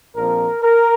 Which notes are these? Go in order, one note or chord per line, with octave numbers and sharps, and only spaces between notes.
A#1 A#2 F3 C4 A#4
A#4